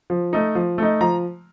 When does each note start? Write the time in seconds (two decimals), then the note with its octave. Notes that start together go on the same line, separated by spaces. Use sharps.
0.10 F3
0.33 A3 D#4
0.55 F3
0.78 A3 D#4
1.01 F3 A#5